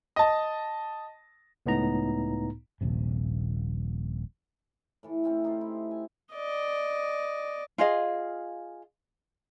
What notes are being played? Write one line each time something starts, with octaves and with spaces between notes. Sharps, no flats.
D#5 A5
C#2 A2 B3 D#4 A#5
D#1 A#1 C3
A2 E3 A4
A3 C4 C#4
D#4 F4 G4 C5
E4
G#5
D5 D#5
F4 G#4 D#5 F5